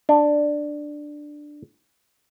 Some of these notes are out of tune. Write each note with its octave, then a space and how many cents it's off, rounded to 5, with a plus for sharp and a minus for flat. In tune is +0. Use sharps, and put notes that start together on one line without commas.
D4 +10